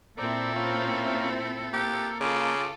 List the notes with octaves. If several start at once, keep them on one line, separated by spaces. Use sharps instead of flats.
A#2 C4 E4 A4 A#4 D5
A#3 C#4 F4
A#3 G4
C#3 F4 A4 D6